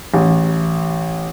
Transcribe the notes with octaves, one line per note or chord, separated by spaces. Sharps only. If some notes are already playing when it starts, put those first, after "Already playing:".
A1